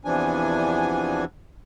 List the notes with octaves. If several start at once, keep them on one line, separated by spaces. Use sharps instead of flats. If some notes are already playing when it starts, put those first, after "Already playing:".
E2 C3 E3 F3 D4 G#5